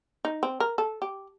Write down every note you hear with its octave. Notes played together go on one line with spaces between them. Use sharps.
D#4
C4
A#4
A4
G4